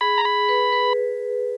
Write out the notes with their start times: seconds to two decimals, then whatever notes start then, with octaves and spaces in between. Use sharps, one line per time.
0.01 G#4 B5
0.18 A#5
0.25 G#4 B5
0.49 B4
0.73 B4